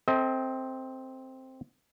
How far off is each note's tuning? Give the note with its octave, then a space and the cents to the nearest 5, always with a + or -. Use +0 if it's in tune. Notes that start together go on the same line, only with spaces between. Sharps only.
C4 +0 A4 +0 D#5 +40